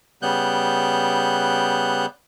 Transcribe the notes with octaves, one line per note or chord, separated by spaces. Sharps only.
C#3 G3 B3 F#6 G6